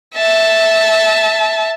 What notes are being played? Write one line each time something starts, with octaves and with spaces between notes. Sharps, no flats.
E5 A5